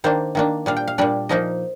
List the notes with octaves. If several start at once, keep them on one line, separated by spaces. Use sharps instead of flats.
D#3 A#3 D4 C5
D#3 A#3 D4
A#2 G3 D4 F5
G5
F5
A#2 G3 D4 D5
A#2 F3 A#3 D#4 D#5